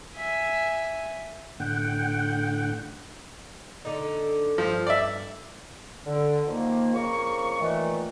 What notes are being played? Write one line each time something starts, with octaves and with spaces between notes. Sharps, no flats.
E5 G#5
A2 D3 F#5 G5
D3 D#4
G2 F3
D5 E5
D3
D#3 F3 A#3
F2 C#3 A#3 F5 C#6
A#2 D#3 E3 A3